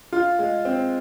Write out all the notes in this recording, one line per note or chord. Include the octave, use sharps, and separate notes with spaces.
F4
G#3
C4